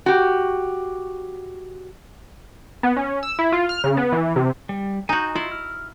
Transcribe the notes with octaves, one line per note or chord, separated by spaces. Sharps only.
F#4 G4
B3
C#4
E6
E4
F4
F6
C#3
B3
E3
C3
G3
D#4 F#4 G#5 G6
E4 F4
F6